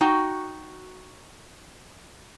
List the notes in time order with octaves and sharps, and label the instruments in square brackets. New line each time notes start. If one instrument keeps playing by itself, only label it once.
[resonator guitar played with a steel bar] D#4 F#4 G5